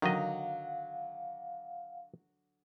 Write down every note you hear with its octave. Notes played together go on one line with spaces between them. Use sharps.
D3 D#3 F#3 D#5 F5 F#5